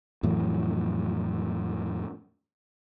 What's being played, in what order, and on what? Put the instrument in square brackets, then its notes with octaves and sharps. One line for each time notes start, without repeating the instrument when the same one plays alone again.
[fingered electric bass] F2 A2 E3 F#3